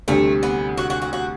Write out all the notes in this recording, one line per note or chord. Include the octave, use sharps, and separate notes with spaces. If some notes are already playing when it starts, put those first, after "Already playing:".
D2 C3 G3 A3 C4
B3
F#4
F#4
F#4
F#4